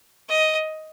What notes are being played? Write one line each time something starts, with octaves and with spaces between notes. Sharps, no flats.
D#5